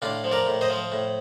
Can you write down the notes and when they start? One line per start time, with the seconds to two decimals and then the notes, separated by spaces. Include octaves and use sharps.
0.02 A2 D4 F4
0.24 F3
0.31 A#4 D5
0.47 A2
0.61 C5 D#5
0.70 F3
0.92 A2